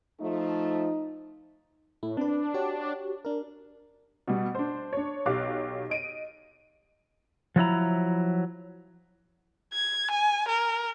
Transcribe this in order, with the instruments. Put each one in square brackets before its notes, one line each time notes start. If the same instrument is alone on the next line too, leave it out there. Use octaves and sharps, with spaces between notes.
[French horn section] F3 A3 [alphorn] D#4
[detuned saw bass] A2 [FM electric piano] E4
[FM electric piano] C4 B4 [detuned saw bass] D4
[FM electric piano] F#4 G4 C#5
D4 A#4
[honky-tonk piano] B2 G3
D4 C5
D4 C#5
B1 G4 F5 D6 F#6
D#5 D7 D#7
[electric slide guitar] F3 F#3 E4 A#5
[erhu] G#6
G#5
A#4